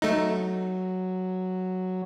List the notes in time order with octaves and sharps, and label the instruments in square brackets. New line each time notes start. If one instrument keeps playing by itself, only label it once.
[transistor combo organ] F#3 [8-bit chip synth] A3 D#4